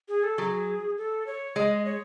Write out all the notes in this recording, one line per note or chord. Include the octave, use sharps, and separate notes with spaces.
G#4
A4
F#3 G#4
A4
C#5
G#3 D#5
C#5